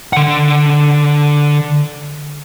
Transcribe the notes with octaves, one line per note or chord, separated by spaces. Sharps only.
D3 F#5